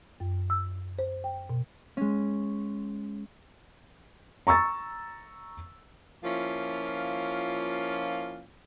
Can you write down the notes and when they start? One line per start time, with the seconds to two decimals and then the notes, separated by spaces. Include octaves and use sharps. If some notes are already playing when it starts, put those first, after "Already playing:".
0.20 F#2
0.50 E6
0.99 C5
1.24 G5
1.50 B2
1.97 G#3 C#4
4.47 A#5 C#6 E6 A6
6.24 F3 A#3 C#4 E4 F4